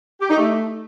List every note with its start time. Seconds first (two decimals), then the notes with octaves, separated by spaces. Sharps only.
0.21 G4
0.29 D#4
0.38 A3